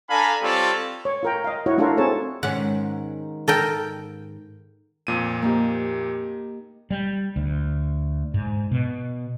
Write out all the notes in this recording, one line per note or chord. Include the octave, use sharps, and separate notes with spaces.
D4 A4 F5 G#5 A#5 B5
G3 C4 F4 A4 C#5 D5
C#5
F4 A#4 G5
D#5 F5
E4 F#4 C#5
A3 D4 F4 F#4 A4 A#4
C4 D#4 G#4 A4 C#5 A5
G#2 D#3 C#4 F#5
A4 A#4 G5
F2 A#2 D#7
A#3 D#4 G4
G3
D2
G#2
B2